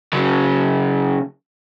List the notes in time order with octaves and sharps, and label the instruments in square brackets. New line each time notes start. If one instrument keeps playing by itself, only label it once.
[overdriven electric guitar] C#3 F#3